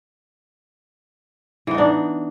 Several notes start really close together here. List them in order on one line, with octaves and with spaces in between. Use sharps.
E3 B3 D#4 D4